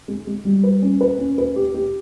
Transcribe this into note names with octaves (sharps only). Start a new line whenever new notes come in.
G#3
G#3
G3
B4
C#4
B4
C#4
B4
G4
G4